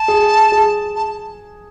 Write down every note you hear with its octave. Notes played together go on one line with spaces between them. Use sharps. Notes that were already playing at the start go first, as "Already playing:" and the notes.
Already playing: A5
G#4
G#4
A5